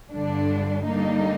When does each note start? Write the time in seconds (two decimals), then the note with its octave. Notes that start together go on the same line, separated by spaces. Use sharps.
0.12 G1 G2 D3 G3 D4
0.86 D3 G3 A#3 D#4